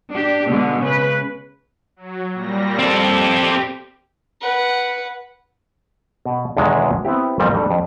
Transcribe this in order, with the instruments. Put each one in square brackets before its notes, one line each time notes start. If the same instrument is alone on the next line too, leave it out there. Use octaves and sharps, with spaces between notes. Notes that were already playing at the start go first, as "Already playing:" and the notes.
[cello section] D4 G4
B2 D3 G#3 B3
C#3 B4
[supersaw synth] F#3
A#2 G3 A#6
[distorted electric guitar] C4 A4 [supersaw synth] G4
[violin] B4 F#5
[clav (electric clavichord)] B2
B1 E2 D3 D#3 G#3
B3 C4 E4 G4
F2 A#2 G3 A4 A#4
G3 D4 A4
F2